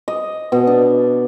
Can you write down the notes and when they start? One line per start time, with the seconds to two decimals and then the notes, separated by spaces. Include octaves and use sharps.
0.08 D#5
0.52 B2
0.67 D4